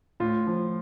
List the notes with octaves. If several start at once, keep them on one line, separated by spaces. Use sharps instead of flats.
A2 F4
F3